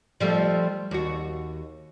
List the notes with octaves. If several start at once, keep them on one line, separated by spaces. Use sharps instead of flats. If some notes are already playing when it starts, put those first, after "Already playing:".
F3 G3 A3
D#2 F#4